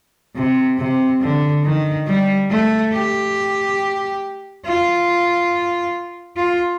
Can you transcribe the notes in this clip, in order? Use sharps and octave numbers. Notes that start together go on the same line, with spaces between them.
C3
C3
D3
D#3
G3
A3
G4
F4
F4